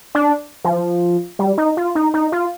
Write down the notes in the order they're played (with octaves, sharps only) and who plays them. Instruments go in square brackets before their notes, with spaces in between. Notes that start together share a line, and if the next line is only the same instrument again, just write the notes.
[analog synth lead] D4
F3
G3
D#4
F4
D#4
D#4
F4